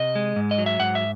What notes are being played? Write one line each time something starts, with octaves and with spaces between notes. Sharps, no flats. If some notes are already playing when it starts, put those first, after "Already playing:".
Already playing: C3 D#5
G#3
G#2
D#5
F#3
E5
G#2 F#5
E5